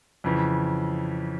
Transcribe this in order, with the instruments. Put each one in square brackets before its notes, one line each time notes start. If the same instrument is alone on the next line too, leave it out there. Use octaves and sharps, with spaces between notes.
[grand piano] F2 C#3 E3